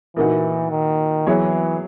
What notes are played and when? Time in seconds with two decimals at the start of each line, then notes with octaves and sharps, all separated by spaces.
0.16 A#2 E3 A#3 D#4 F#4
0.71 D#3
1.26 E3 F#3 B3 E4 G#4 C#5